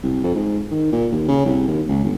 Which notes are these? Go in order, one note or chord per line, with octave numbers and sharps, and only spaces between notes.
C2
F2
G#2
D#3
A#2
D#2
C#3
C2
D#2
C#2
G1